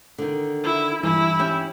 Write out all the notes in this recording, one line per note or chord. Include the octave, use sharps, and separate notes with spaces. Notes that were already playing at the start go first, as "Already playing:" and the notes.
D3 D#3
E4
G2 E3 E4
C#4 G4